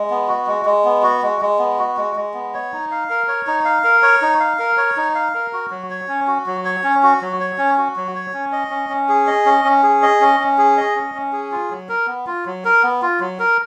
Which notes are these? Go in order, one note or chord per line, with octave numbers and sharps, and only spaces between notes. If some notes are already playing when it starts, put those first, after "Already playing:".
Already playing: G#3
B3
F#4
G#3
G#3
B3
F#4
G#3
G#3
B3
F#4
G#3
G#3
B3
C#5
D#4
F5
A#4
C#5
D#4
F5
A#4
C#5
D#4
F5
A#4
C#5
D#4
F5
A#4
F#4
F#3
C#5
C#4
F#4
F#3
C#5
C#4
F#4
F#3
C#5
C#4
F#4
F#3
C#5
C#4
D#5
C#4
C#4
G#4
D#5
C#4
C#4
G#4
D#5
C#4
C#4
G#4
D#5
C#4
C#4
G#4
F4
F#3
A#4
B3
F4
F#3
A#4
B3
F4
F#3
A#4